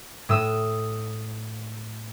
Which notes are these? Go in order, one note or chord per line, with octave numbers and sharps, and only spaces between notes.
A2 D#6 E6